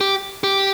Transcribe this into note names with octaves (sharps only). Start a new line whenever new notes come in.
G4
G4